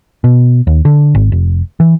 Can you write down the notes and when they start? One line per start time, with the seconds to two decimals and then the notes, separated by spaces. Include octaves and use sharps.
0.24 B2
0.67 D#2
0.85 D3
1.15 G#1
1.32 F1
1.80 E3